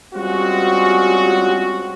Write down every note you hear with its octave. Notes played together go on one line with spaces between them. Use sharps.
G3 G#3 C4 C#4 F4 F#4